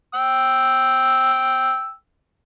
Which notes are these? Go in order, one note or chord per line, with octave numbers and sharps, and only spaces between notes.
G5 E6